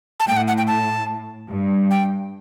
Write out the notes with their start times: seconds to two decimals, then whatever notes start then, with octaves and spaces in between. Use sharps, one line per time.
0.20 A5
0.27 A2 G5
0.37 F#5
0.48 F#5
0.58 G5
0.67 A5
1.49 G2
1.91 G5